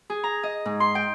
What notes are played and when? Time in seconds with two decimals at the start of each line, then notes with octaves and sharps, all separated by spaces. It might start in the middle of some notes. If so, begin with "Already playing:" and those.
0.10 G#4
0.24 A#5
0.43 D#5
0.65 G#2
0.80 C6
0.95 G5